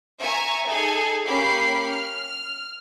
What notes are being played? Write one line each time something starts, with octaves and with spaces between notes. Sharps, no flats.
E5 G#5 A#5 C#6
D#4 G#4 A4 G#5
A#3 C#4 G4 B5 C7
F6